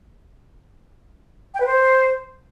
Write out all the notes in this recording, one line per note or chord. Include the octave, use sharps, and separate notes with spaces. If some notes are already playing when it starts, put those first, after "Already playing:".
G5
B4
C5